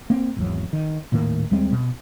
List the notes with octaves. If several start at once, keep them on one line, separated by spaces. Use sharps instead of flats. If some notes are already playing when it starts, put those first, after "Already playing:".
A#3 C4
G#1 E2 F#3
D#3
D#1 A2 D#3 A#3
D#2 G3 G#3 C4
B2